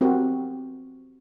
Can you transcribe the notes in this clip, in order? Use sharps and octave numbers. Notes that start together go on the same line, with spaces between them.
C4 F#4 G4 A#4